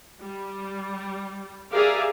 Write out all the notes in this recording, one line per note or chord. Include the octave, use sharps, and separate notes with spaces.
G3
G4 G#4 A#4 D5 E5 F5